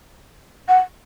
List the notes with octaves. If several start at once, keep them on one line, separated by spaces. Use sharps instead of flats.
F#5